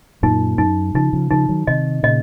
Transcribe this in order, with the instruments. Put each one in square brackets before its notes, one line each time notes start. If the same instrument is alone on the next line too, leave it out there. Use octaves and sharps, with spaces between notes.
[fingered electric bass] F#2 A#2 [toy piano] D#4
[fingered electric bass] F#2 [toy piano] D#4
[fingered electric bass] C#3 F3 [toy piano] D#4
[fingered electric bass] C#3 F3
[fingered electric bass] C#3 F3 [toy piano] D#4
[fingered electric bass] D#3 F#3
[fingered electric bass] C3 D#3 [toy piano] D#5
[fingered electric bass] A#2 C#3 [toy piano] D#5